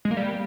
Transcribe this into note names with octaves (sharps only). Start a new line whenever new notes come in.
G#3
A#3
G3